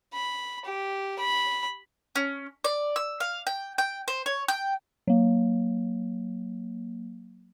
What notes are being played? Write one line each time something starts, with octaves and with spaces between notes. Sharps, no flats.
B5
G4
B5
C#4
D5
E6
F5
G5
G5
C5
C#5
G5
F#3 A#3